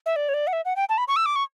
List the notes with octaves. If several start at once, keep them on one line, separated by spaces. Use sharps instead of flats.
E5
D5
C#5
D5
F#5
E5
F#5
G5
A5
B5
C#6
E6
D6
C#6